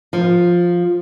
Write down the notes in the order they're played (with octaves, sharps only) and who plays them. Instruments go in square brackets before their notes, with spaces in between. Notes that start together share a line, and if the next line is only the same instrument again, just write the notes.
[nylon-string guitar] F3